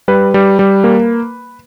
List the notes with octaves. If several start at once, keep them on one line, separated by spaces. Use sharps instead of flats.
G3 B4
G3
G3
A#3